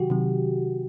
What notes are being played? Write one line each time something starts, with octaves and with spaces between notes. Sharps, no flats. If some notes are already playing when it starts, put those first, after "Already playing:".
Already playing: C3 D#3 F#3 F#4 G4
C3 D#3 F#3